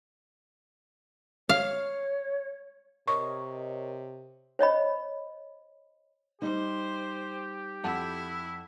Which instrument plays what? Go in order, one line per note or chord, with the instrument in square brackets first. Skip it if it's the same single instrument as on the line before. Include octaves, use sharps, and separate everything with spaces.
[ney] C#5 [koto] F5
[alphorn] C3 [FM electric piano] A#4 C#5 D#5 [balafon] C#6
[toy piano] C5 C#5 D#5 B5
[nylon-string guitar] G3 D#4 [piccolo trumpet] G4 [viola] C5
[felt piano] F2 F#5 A5 [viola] E4